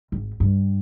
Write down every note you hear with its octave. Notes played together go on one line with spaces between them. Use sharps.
G#1
G2